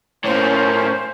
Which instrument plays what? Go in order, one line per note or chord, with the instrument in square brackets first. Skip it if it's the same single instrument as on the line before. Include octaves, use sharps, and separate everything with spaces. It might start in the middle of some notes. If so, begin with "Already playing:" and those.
[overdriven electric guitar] A2 A#3 [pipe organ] C#4 [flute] C5 [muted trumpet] C#5